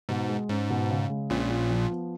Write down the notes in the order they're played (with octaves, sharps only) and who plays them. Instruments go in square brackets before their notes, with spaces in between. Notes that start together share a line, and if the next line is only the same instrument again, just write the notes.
[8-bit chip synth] G#2 [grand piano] B2
[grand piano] G#3
[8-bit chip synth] G#2 [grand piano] C#4
[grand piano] B2
C#3
G#3
[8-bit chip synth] A#1 A#2 [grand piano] C#4
[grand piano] F4
F3
B3